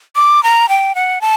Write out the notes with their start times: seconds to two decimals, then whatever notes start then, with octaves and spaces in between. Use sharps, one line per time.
0.16 D6
0.43 A#5
0.69 G5
0.95 F#5
1.21 A5